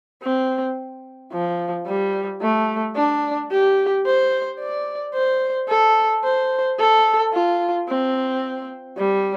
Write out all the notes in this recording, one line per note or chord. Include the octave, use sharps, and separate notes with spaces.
C4
F3
G3
A3
D4
G4
C5
D5
C5
A4
C5
A4
F4
C4
G3